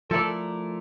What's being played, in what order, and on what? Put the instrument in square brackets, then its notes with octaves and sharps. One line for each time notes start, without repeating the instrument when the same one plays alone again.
[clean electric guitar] F3 A3 E4 A#4 D5 [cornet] A4